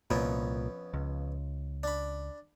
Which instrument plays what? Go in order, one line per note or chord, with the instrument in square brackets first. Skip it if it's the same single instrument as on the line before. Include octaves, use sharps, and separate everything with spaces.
[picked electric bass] C2 A#2 [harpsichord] F2 B3 C#4
[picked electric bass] C#2
[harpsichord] D4 B5